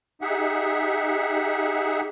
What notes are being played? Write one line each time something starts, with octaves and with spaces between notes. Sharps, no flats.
D#4 G4 G#4 E5 F#5